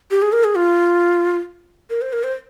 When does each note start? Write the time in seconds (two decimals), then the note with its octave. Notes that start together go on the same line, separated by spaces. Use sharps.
0.11 G4
0.22 G#4
0.32 A#4
0.44 G#4
0.55 F4
1.90 A#4
2.02 C5
2.13 A#4
2.24 C5